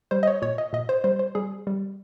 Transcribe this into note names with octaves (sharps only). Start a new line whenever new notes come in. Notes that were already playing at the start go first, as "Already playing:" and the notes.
G3 C5
D#5
C#5
A#2 C#5
D#5
A#2 D#5
C5
G3 C5
C5
G3 G#4
G3